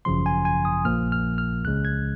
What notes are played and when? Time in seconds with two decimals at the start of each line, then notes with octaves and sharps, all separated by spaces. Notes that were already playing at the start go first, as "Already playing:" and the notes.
0.05 G#1 F#2 C#3 F3 C6
0.26 G#5
0.45 G#5
0.65 D#6
0.85 A#1 A#2 F3 A#3 F6
1.12 F6
1.38 F6
1.64 C#2 C#3 G#3 F#6
1.85 G#6